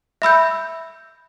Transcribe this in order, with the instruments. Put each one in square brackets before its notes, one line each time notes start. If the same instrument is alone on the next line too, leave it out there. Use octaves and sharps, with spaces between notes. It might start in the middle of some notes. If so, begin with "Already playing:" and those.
[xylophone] E5 B5 E6 G6